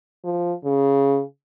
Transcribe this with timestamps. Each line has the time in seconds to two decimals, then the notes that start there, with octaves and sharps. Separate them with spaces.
0.24 F3
0.65 C#3